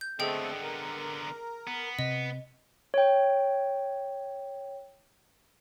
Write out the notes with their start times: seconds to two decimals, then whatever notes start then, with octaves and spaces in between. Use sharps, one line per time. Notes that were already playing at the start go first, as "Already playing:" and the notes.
0.01 G6
0.20 D3 A3 B3 C4 G#4 A4 D#5 G5
0.63 A#4
1.67 B3
1.99 C3 D#5
2.94 C#5 G5